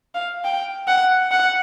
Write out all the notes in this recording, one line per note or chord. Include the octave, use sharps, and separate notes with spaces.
F5
G5
F#5
F#5